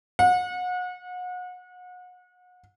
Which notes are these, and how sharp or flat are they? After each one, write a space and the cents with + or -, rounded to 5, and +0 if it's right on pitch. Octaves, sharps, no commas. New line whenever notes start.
F#5 -35